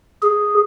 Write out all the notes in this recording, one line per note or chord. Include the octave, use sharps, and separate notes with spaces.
G#4